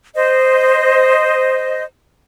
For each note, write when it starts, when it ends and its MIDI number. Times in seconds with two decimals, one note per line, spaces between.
0.15 1.83 72
0.15 1.83 75